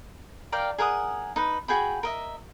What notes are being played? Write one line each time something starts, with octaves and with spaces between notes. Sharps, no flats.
A#4 D5 F5 G5
G#4 A#4 F#5 D#6
D#4 B4
F#4 G#4 G5 B5
A#4 D#5 E5